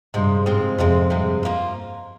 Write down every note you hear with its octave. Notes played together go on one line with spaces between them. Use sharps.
G2 C3 F3 G#3 C4
G#2 C3 F3 G#3 C4
F2 C3 F3 G#3 C4
G2 C3 F3 G#3 C4
F3 A#3 F4